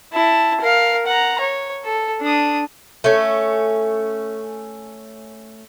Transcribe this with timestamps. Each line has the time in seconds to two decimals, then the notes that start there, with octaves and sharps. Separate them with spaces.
0.13 E4 A5
0.61 A#4 F5
1.07 F#5 A#5
1.40 C#5
1.84 A4
2.22 D4 D#6
3.04 A3 C#4